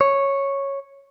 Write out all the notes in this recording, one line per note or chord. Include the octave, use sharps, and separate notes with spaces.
C#5